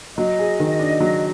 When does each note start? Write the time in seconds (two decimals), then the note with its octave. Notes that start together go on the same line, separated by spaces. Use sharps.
0.18 F#3 D#5
0.39 G#4
0.60 D#3
0.79 D4
1.00 F#3